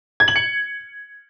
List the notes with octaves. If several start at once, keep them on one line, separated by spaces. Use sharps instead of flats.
G#6
F#7
C#7